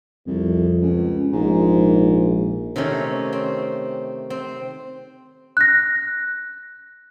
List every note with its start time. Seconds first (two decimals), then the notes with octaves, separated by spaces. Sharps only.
0.27 C2 F2
0.81 C#2
1.32 A#1 G#2
2.76 C3 D#3 A3 C#4
3.33 C4
4.30 C4
5.57 F#6 A#6